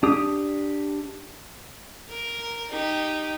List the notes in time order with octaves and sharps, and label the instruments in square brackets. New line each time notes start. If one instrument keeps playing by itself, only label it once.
[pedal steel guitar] D4 G4 D#6
[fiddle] A#4
D#4 G4